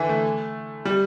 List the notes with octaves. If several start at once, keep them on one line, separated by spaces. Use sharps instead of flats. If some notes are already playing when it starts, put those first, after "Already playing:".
Already playing: D3 E3
A3
G3